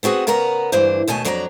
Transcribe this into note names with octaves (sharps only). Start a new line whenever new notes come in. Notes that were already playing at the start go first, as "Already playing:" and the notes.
B3 C4 F#4 G#4 F#5
C#3 B3 A#4 F#5 A#5
D2 G2 E3 D4 C5
D#2 B2 A3 G#5 A5
F2 F#3 D4 F#4 G4 A#5